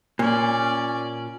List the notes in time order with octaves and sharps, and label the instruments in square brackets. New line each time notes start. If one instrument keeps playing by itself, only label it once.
[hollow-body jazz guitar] A#2 [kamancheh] C#4 D5